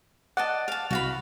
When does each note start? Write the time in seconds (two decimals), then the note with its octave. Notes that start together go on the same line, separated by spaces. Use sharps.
0.37 D5 D#5 F#5 A5
0.68 F5 A5
0.91 C2 F#4 F5 B5